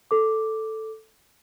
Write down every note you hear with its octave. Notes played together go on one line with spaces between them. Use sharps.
A4 D6